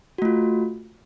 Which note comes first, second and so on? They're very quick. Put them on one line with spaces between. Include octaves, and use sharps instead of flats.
F#4 A3 F4